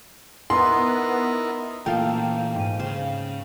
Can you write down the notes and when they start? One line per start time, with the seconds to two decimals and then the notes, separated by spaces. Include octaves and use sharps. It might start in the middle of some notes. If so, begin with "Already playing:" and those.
0.50 B3 D#4 E4 A#4 C6
1.86 A#2 E3 A3 A#3 F4 A4 F5 G5
2.55 G#2 D#7
2.80 C#3 C5